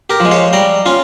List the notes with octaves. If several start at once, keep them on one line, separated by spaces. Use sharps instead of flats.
G4 A#4
F3
G#3
C#5 F5
G3 G5 A#5
C#4 F4